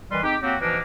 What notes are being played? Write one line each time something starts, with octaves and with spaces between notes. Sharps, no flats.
D#3 E3 G3 B4 C6
G#3 C4 D#4 G4
F#3 A#3 C4 F#4 G4
B2 E3 F3 A#3 D4 D#4